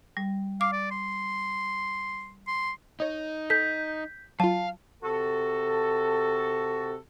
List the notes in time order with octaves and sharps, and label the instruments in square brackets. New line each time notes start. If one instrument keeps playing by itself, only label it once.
[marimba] G3
[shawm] F5 [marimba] D6
[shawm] D5
C6
C6
[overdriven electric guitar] D#4 [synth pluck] C#5 D#5
[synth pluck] A4 [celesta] G6 B6
[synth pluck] F#3 F4 [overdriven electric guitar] F5 [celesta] A5
[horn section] C3 F#4 A4